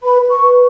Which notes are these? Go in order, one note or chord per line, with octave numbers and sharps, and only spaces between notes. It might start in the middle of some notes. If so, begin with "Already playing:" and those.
B4 B5
B4
C#6
B4